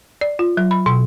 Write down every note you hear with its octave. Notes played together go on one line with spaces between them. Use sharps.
D5
F4
F#3
B5
B2